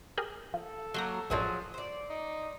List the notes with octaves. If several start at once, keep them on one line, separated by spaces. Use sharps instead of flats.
G4 G#4 A#4
F3 A4
F#3 A#3 A#4 C6 G6 A#6
A1 F#2 F3 F#3 D4 G#4
C5 D5
D#4